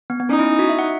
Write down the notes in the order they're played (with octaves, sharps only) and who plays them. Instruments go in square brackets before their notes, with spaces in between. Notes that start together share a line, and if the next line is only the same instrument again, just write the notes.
[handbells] B3
B3
[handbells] C#4 [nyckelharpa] D#4
[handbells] E4
F#4
E5
F#5